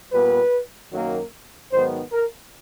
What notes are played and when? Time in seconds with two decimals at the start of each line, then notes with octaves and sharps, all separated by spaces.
0.12 A#2 G3 B3 B4
0.92 F#2 D#3 F#3 A#3
1.72 G#2 D#3 F#3 B3 C5
2.12 A#4